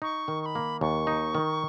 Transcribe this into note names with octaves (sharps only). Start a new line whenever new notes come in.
D#4 C#6
D#3
C#6
B5
A#3
D#2 C#6
D#4
D#3